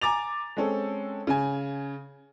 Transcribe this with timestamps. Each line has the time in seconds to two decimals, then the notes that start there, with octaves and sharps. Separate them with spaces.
0.01 G#5 A#5 D6 A6 F7
0.57 G#3 C4 C#4 A4
1.27 C#3 G#5